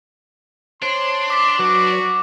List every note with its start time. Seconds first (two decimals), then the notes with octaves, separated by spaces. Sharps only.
0.82 D4 C5 C#5 C6
1.30 D6 B6
1.59 F#3 F#4 B4